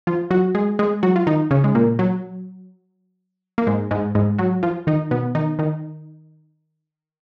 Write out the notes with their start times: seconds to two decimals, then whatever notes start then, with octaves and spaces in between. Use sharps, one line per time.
0.07 F3 F4
0.31 F#3 F#4
0.55 G#3 G#4
0.79 G#3 G#4
1.03 F#3 F#4
1.16 F4
1.27 D#3 D#4
1.51 C#3 C#4
1.64 G#3
1.75 A#2 A#3
1.99 F#3
3.58 A#3
3.67 G#2 G#3
3.91 G#2 G#3
4.15 G#2 G#3
4.38 F#3 F#4
4.63 F3 F4
4.87 D#3 D#4
5.11 B2 B3
5.35 D#3 D#4
5.59 D#3 D#4